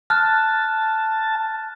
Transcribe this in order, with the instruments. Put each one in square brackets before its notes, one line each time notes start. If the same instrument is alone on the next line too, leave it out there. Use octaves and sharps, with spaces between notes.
[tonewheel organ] A5 [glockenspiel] F6 F#6 A6